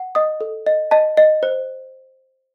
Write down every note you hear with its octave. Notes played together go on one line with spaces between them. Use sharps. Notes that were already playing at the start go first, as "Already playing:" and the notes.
Already playing: F#5
D#5 D#6
A4
D#5
D#5 A5
D#5
C5